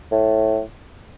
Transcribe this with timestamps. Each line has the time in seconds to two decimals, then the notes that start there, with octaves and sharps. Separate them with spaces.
0.12 A2